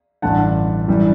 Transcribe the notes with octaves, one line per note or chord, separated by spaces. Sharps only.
A1 G2 D3 F#5 A5
F#2 E3 G3